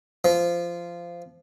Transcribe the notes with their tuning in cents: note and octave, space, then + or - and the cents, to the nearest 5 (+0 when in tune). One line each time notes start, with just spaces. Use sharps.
F3 -15